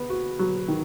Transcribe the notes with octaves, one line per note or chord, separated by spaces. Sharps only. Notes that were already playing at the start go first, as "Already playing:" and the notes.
Already playing: B3
F#4
F#3
D#3